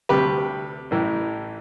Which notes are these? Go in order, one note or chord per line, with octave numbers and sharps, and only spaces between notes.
D2 C3 G3 G4 B4
A1 A2 E3